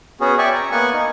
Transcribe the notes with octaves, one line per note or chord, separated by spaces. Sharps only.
B3 C#4 F#4 G#4
D5 E5 G5 G#5 C#6
A#5
A#3 B3 F#5 G#5 C#6
D#4